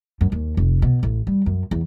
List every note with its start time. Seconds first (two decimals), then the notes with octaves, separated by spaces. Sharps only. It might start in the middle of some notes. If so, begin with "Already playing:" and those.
0.21 F#2
0.32 D#2
0.57 F1
0.82 B2
1.03 A1
1.27 G3
1.46 F#2
1.71 E2